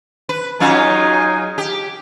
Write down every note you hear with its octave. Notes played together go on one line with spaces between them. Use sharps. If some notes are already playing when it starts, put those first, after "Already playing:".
B4
F#3 G#3 C#4 D#4 F4 G#5
G4